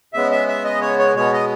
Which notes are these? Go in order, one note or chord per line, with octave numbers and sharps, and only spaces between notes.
C#3 G#3 B3 E5
E5
E5
D#5
C#5
C#5
B2 G#3 B3 C#5
D#5